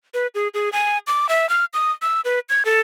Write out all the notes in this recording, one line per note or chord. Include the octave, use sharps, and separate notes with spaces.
B4
G#4
G#4
G#5
D6
E5
F6
D#6
E6
B4
G#6
A4